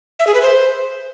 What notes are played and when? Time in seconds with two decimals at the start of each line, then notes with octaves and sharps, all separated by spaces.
0.19 E5
0.27 G#4
0.34 B4
0.42 C5